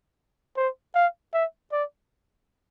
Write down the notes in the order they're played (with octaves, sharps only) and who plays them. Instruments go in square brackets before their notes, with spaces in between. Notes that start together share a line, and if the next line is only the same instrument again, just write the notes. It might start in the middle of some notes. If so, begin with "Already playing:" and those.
[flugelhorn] C5
F5
E5
D5